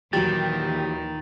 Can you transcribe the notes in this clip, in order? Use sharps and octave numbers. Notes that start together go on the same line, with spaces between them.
D#2 A#2 D#3 E3 F#3 G4 A6